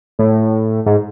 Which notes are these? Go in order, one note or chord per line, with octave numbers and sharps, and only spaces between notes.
A2
G#2